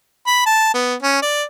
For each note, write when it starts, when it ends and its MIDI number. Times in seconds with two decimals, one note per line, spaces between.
0.27 0.44 83
0.46 0.71 81
0.74 0.95 59
1.03 1.22 61
1.22 1.43 74